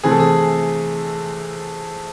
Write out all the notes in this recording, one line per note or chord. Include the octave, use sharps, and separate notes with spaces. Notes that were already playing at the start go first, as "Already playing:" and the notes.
C3 E3 A3 G#4
A4
G#4